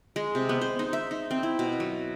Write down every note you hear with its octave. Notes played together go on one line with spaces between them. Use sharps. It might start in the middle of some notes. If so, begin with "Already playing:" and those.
G#3
C3
B3
C5
D#4
E5
D#4
C4
E4
B2
F#3